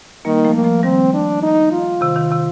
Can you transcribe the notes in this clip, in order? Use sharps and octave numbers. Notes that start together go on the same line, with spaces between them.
D#3 G3 A#3
F3 A3
A#3
F3 A3
D#3 G3 C4
D4
D#4
F4
C3 D#3
C3 D#3
C3 D#3